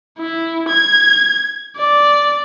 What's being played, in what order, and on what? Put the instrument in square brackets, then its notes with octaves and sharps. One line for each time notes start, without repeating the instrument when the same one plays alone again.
[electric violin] E4
G#6
D5